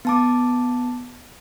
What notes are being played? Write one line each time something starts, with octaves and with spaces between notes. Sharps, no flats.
B3 A5 D6